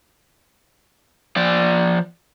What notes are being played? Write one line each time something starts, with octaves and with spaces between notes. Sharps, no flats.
F3 D5